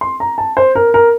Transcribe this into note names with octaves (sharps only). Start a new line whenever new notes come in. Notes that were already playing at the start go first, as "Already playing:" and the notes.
C6
A#5
A5
C5
A#4
A#4